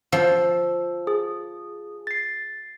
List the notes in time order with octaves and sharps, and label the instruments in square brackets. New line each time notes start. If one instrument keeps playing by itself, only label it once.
[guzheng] F3 [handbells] E6
[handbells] G#4
A6 C7